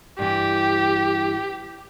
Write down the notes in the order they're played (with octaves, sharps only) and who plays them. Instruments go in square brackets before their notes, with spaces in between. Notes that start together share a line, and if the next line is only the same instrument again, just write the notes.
[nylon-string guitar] G2 E3 [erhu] G4